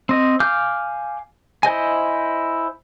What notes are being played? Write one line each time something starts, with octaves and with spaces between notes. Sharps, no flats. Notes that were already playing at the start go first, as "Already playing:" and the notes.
C4 D#5
F5 G#5 D6 F6 G6
E4 C5 D#5 G#5